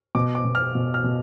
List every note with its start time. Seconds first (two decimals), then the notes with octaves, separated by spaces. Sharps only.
0.15 B2 D6
0.35 D6
0.45 B2
0.55 F6
0.75 B2
0.94 F6
1.04 B2